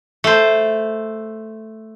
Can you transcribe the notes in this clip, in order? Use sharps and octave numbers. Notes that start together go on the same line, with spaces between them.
A3 C5